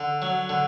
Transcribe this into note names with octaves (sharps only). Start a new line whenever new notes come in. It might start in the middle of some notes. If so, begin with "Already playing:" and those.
Already playing: D3
F#3
D3